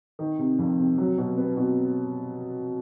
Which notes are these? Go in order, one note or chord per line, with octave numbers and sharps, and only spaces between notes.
D#3
C3
F2
C3
F#3
B2
B3
B2